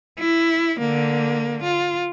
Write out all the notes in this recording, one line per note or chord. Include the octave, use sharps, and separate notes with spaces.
E4
D3 A#3
F4